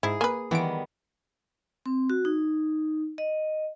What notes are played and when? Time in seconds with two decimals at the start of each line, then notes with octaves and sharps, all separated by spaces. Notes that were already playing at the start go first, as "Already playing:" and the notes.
0.03 G#2 E4 G#4
0.21 A#3 B4 G#5
0.51 D#3 E3 G3 B3 D7
1.86 C4
2.10 F#4
2.25 D#4
3.18 D#5